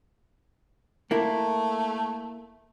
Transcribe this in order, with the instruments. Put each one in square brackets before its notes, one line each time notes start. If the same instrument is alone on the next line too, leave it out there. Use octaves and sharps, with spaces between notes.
[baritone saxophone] A3 [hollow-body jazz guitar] A#3 E4 A#4